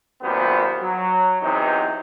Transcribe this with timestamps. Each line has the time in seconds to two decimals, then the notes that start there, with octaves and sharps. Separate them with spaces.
0.22 G#1 F#2 A#2 B3 G4 C5
0.81 F#3
1.41 E2 C3 E3 F#3 D#4